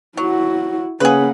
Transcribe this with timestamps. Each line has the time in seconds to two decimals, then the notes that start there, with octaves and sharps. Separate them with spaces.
0.17 F#3 E4 F#4
1.00 C#3 A#3 G#4 B4 F#5